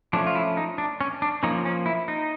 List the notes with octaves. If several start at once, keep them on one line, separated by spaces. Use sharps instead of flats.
F3 A3 C#4 D4
F4
E4
D#4
D4
C#4
D4
F3 A#3 C#4 D#4
C#4
E4
D#4